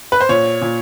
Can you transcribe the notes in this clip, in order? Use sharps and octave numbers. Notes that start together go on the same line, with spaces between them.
B4
C5
A#2 C#5
A#2